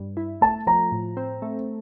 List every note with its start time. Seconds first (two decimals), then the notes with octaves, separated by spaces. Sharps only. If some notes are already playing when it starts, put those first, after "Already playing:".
Already playing: G2
0.17 E4
0.41 A3 A5
0.67 F3 A#5
0.92 A2
1.17 C4
1.42 A3